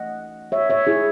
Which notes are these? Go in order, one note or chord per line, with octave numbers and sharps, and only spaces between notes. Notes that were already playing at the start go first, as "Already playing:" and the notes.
Already playing: E3 A3 C#4 D#5 F#5
C#5 E5
C#5 E5
E4 G#4